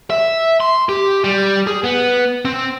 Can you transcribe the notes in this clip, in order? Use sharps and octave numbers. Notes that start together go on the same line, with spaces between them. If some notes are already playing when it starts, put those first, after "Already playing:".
E5
C6
G4
G3
G#4
B3
C4